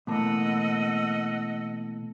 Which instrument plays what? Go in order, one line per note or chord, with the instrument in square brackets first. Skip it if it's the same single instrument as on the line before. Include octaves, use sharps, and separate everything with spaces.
[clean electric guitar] B2 E3 A#3 [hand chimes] A3 A5 [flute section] D#5 F#5 E6